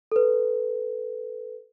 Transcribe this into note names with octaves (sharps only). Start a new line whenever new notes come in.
A4 B4